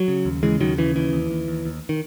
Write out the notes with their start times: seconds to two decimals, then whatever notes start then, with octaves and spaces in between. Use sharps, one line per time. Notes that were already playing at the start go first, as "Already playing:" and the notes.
Already playing: F#3
0.08 C#3
0.25 D#2
0.43 C#3 E3 G#3
0.60 D#2 D#3 F#3
0.78 C#3 E3
0.95 D#2 E3
1.13 D#2
1.31 D#2
1.48 D#2
1.65 D#2
1.89 D#3